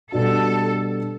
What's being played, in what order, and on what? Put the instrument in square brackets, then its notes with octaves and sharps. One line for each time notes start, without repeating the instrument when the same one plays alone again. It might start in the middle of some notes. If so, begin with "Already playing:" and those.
[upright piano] B2 G3 D4 F#4 [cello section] A4